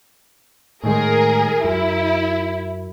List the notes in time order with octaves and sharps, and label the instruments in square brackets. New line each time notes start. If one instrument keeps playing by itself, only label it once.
[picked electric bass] A2 D#3 G#3 [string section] G#4 A#4
[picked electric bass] F#2 [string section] E4